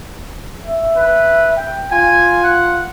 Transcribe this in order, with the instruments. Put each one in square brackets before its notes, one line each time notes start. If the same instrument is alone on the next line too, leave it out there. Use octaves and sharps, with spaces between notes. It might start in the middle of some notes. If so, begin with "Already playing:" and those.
[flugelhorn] E5
[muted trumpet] B4
[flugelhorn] G5
[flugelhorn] F4 [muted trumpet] G#5
[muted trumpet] F#5